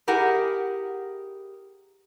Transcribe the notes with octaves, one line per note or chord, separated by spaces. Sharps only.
E4 G4 G#4 A#4 F#5